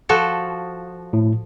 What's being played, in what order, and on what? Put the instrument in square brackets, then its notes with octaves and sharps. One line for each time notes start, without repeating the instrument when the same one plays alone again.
[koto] F3 F#4 A4
[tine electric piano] A2